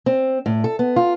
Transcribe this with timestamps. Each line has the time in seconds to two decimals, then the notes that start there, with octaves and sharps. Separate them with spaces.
0.06 C4
0.46 A2
0.64 A4
0.79 B3
0.96 F4